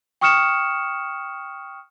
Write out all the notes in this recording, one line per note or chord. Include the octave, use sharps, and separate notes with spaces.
G5 C#6 D#6 F6 C#7 E7